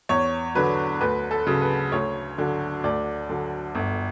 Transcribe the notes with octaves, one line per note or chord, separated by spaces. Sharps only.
E2 C#5
D3 F#3 B4
D2 B4
A4
C#3 F#3
B4
D2 C#5
D3 F#3
D2 D5
D3 F#3
G1